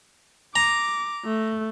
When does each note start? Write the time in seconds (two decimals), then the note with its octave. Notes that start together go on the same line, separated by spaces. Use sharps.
0.56 A#5 D6
1.25 A3